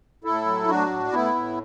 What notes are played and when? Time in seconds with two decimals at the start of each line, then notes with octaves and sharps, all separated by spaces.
0.24 A2 E4 A4
0.46 F#3
0.68 A2 D4 F#4
0.90 A2
1.12 A2 B3 E4
1.35 A2